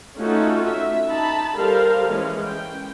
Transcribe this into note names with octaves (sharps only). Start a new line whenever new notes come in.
A3 C#4 D#4 F4 F#4 A4
E5
D#4 A5 B5
G3 A4 A#4 C5 F5
E3 G#3 C#4
G5